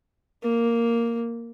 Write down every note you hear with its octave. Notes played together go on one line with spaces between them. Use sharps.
A#3